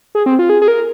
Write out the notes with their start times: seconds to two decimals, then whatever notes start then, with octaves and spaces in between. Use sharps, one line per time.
0.15 G#4
0.26 C4
0.39 F4
0.50 G#4
0.62 G#4
0.68 A#4